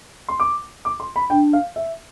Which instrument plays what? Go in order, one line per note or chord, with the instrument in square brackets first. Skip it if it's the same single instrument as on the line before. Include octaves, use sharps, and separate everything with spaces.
[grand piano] C6
D6
D6
C6
B5
[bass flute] D4 [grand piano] G5
[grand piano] F5
E5